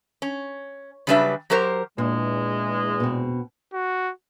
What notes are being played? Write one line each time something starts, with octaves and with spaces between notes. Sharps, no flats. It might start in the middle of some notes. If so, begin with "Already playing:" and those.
C#4
C#3 F#3 G3 D4 B4 E5
F#3 G4 A#4 C5
E2 A#2 G#3 D4
B2 C4
F#4